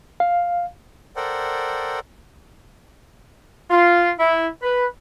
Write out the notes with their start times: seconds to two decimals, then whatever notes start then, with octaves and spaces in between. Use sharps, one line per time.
0.20 F5
1.16 A4 A#4 C5 D5 F#5 G5
3.71 F4
4.18 E4
4.63 B4